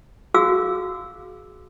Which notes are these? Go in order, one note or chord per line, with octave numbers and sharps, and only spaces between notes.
F#4 G#4 F5 E6